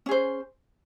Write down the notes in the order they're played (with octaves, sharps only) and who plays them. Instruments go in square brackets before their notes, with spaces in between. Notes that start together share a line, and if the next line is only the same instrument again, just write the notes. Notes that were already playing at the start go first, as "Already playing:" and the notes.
[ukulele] C#4
G#4
C5